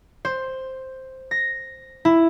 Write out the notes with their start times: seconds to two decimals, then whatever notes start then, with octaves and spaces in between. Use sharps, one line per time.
0.25 C5
1.31 A#6
2.05 E4